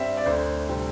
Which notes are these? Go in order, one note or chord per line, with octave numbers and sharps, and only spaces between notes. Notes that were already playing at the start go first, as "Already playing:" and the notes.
Already playing: G2 G3 C4 E5
D5
D2 C5
C3 G3 C4